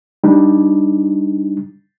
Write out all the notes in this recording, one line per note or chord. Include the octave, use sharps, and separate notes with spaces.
G3 D4 D#4